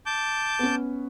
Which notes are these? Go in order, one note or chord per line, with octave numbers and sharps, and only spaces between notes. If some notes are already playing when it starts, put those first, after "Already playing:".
A5 D6 G6
B3 C#4